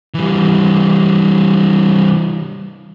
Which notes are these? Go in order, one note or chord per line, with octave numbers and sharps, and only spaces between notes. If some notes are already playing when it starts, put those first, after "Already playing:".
E3 G3